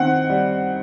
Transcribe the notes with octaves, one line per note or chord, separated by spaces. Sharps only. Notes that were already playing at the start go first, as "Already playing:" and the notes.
Already playing: D#3 C4 F#5
G3